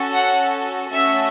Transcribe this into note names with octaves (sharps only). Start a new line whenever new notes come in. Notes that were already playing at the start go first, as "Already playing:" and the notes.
Already playing: C#4 F#4 A4
F#5
A3 C#4 F#4 A4 E5